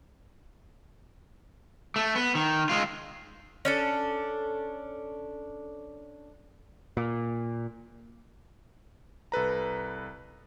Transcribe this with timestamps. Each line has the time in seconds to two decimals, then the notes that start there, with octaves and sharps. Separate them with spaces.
1.96 A3
2.16 B3
2.35 D#3
2.69 G#3 F4
3.65 C#4 D4 A4
6.97 A#2
9.32 C2 A4 B4 A#5